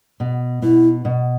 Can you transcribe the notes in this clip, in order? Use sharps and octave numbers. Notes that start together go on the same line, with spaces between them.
B2
B2 E4
B2